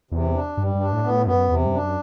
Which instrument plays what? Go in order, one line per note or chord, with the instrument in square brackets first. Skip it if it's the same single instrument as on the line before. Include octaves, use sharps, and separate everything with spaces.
[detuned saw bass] E2 [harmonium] C3
[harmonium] D4
[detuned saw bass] G2 [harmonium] G3
[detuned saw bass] G2
[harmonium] D4
[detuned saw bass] A2
[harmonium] B3
[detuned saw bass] A2
[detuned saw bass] F#2 [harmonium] B3
[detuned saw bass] E2 [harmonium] C3
[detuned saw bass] G2
[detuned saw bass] F#2 [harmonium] D4